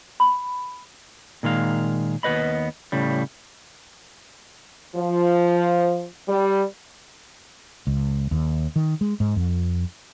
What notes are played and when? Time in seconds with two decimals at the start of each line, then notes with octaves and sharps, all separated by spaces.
0.20 B5
1.43 A#2 D#3 G#3 F5
2.23 D#2 B3 B4 D#5 B5
2.92 A2 C#3 G3
4.96 F3
6.28 G3
7.87 C#2
8.31 D#2
8.76 D#3
9.01 G#3
9.20 G#2
9.36 F2